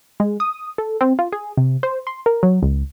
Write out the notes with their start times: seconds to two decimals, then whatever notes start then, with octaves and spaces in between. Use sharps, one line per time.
0.20 G#3
0.40 D#6
0.78 A4
1.01 C4
1.19 F4
1.32 G#4
1.57 C3
1.83 C5
2.07 C6
2.26 A#4
2.43 F#3
2.63 C#2